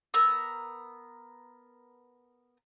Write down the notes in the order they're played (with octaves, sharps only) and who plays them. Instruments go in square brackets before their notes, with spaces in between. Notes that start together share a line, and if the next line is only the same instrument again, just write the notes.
[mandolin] B3 A#4 A#5 E6